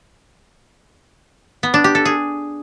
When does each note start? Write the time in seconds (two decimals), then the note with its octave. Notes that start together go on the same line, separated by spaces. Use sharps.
1.63 B3
1.74 D4
1.84 G4
1.95 A4
2.05 G#4